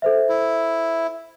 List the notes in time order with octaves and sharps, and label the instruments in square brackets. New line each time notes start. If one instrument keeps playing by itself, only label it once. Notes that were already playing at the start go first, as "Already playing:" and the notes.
[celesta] A4 C5 E5
[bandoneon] E4